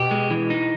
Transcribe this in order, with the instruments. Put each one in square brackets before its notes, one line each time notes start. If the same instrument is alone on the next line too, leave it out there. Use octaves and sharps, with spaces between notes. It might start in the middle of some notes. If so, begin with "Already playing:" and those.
Already playing: [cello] B2 [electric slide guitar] G4
[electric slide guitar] G#3
E3
D#4